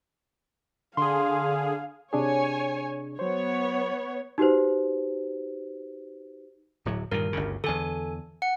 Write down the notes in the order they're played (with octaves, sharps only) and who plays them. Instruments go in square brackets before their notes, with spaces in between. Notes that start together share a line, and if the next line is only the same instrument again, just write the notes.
[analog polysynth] D3 G#4 [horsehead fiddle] F5 [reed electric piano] C6
[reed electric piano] C3 D4 G#4 [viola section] C#5 G#5
[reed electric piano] F#3 C5 [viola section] B3 C#5
[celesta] D#4 F#4 G4 B4 C5
[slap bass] D1 A2 F#3
[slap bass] G2 A#2 D#3 [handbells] A#4
[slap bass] G1 D2 C#3
[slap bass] E2 D3 [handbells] A4 G#5
[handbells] F#5 C#7